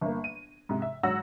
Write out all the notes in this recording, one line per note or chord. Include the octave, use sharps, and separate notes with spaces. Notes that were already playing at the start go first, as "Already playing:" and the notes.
G1 A#3
D#7
G#2 C3
E5
G#2 F#3 C#5 F#5 E6 A#6